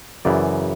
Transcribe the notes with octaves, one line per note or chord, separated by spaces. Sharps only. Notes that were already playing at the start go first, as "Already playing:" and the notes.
F#2 C#3 E3 D5